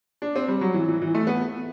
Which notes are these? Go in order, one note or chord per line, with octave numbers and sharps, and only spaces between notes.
D4
C4
G3
F#3
E3
E3
E3
A3
B3